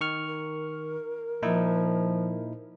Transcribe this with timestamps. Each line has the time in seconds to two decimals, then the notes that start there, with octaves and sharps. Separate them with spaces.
0.01 D#3 C#6 F6
0.26 A#4
1.42 A#2 F3 D#4 E4